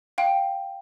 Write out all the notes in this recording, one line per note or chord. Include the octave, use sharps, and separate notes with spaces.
F5 G5